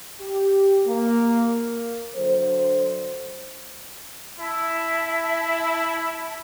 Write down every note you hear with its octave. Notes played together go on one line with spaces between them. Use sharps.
G4
A#3
D3 F#3 A4 C5
E4 E5 A5